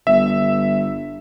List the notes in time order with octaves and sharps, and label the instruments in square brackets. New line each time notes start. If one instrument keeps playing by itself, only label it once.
[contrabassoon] G1 [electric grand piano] E5